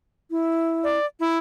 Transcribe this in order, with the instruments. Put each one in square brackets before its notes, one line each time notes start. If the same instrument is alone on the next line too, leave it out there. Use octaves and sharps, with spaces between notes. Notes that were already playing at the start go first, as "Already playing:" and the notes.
[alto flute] E4
[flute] D5
E4